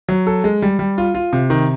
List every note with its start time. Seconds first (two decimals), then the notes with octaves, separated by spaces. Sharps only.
0.09 F#3
0.27 A4
0.44 G#3
0.62 G3
0.79 G3
0.98 F4
1.14 F4
1.33 C3
1.50 D#3